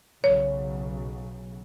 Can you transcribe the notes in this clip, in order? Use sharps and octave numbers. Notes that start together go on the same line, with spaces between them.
B1 C#3 F#3 C#5